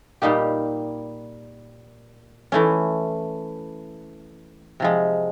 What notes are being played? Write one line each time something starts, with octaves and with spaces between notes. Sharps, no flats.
A#2 G3 A#3 D#4 G4
E3 A3 C#4
C3 F3 G#3